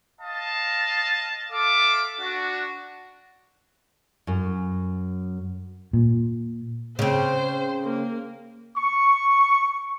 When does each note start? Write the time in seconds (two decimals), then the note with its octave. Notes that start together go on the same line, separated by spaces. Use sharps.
0.20 D#5 F5 A5
1.52 A4 E5 F5 D6
2.20 D4 F#4
4.27 F#2
5.93 A#2
6.99 C#3 C4 C5
7.84 A#3
8.76 C#6